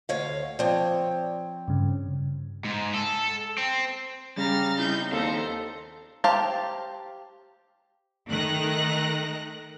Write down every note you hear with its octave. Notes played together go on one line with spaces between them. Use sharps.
D2 C#5 F5
F3 C4 C#5 D5
G2 C#3
G#2
A4
C4
C#3 G3 A#5 F6 A6
C4 D#4 E4 G6
D#2 A4 C5 D5 F5 A#5 C6
G4 C5 F5 A5 A#5
D#3 A3 A#4 F#6 A#6